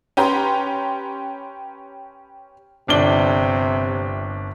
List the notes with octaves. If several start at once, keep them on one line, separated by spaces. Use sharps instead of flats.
C#4 G4 B4 A#5 C6
G1 C3 D4 G7